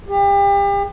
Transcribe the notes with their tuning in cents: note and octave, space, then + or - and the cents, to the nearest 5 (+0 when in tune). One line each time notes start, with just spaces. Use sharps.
G4 +35